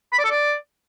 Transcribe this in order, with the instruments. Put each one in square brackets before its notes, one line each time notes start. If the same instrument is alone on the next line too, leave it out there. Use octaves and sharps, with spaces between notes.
[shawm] B5
D5
A4
D5